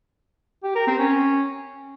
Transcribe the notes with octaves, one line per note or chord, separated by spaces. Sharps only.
G4
A#4
C4
C#4